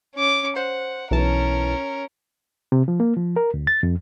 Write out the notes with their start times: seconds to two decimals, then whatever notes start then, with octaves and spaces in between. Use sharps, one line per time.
0.15 C#4 D6
0.56 C5 F#5
1.11 B1 E3 C#4 A#4 A5
2.72 C3
2.88 F3
3.00 A#3
3.17 F3
3.36 A#4
3.54 D2
3.67 A6
3.83 F2